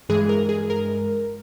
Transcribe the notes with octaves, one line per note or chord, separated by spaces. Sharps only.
G2 E3 G#3 G#4
A#4
G#4
A#4